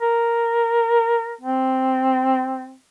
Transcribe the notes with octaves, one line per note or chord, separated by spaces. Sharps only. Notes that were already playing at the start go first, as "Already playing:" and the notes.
A#4
C4